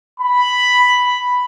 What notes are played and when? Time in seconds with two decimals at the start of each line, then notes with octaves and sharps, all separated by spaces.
0.20 B5